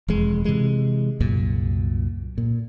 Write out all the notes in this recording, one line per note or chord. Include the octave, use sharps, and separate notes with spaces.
E1 F2 G#3
C3 E3 G#3
C2 F#2 A#2
A#2